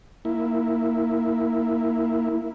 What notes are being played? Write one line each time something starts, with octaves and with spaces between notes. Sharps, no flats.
A#3 E4